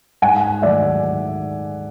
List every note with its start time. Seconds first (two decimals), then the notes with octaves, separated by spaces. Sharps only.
0.22 G#2 F#5 G#5
0.62 D#3 F#3 A3 D5 E5